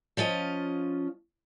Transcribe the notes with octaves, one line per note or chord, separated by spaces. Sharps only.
F3 C#4 F4 D#5